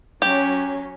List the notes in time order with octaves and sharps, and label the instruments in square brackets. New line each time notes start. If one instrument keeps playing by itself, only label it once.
[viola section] F#3 C#4 [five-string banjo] G4